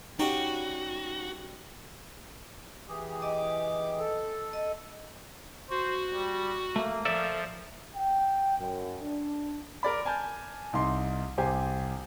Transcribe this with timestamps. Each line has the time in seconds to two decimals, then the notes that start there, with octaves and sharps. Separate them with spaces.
0.19 G3 C#4 D#4 F#4 G5
2.88 E3 G4 G#4
3.22 D#5 D6
3.99 A4
4.53 D#5
5.70 F#4 C5
6.12 G3
6.76 A3 A#3
7.05 F3 A4 D5 E5
7.96 G5
8.58 F#2
9.02 D4
9.83 A#4 D5 B5
10.06 G#5 A5 F6 G6
10.73 C2 D#4 C6
11.38 C2 G4 C5 G#5